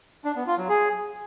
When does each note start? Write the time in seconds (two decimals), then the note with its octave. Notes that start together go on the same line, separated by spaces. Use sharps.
0.25 D4
0.36 B3
0.47 F4
0.58 F#3
0.69 G#4